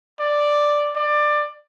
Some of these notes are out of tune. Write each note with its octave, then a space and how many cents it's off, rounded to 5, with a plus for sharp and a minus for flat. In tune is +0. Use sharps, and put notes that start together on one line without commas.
D5 +0
D5 +20